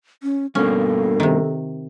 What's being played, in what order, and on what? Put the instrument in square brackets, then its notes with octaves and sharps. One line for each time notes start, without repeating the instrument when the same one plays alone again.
[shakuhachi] C#4
[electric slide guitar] G2 B2 A#3 [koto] C#4 [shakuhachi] A4
[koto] C3 D#3